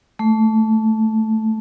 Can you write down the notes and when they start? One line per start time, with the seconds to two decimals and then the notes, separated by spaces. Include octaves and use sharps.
0.19 A3